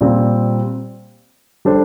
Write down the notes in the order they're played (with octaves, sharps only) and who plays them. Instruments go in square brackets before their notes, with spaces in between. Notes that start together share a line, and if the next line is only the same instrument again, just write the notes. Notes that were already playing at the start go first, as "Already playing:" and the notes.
[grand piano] A#2 G3 C4
G3 D4 A4 C5